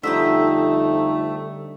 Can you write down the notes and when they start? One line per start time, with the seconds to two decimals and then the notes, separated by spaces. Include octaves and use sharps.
0.03 F2 D3 G3 A3 C4 D#4 D#5 E5